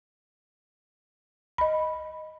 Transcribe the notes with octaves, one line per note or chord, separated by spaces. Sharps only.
D#5 B5